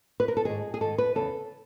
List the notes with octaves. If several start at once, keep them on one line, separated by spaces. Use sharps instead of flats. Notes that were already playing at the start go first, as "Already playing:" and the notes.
B4
A#4
A4
G#2 D#3 G#4
G#4
G#2 D#3 A4
B4
E2 C#3 E3 A4